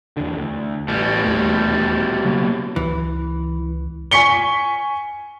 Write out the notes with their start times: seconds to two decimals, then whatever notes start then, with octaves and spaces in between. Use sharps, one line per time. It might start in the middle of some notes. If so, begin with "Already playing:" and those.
0.17 E2 D3
0.36 D2
0.88 A1 B2 G3
1.24 D#1 E2 A3
2.25 C#3 F#3 A#3
2.76 C#2 E3
4.11 G#5 C#6 B6 C#7 G7